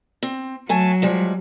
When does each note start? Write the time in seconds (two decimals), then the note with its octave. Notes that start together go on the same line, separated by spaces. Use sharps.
0.23 C4
0.69 F#3 A3 G#5 A5
1.02 F3 G3 G#3